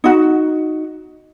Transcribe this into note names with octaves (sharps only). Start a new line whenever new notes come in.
D#4 F#4